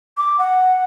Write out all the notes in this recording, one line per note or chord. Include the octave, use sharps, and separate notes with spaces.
D6
F#5